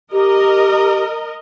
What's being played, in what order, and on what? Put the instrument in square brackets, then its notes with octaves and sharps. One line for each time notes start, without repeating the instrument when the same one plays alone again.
[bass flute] G4 [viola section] A#4 D#5